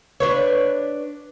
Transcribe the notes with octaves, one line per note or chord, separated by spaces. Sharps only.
D4 B4 C#5